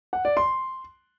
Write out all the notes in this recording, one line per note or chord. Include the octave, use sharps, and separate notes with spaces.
F#5
D5
C6